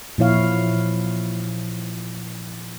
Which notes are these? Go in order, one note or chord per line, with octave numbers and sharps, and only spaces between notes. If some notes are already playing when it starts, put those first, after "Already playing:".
A#2 F3 E4 C#5 F5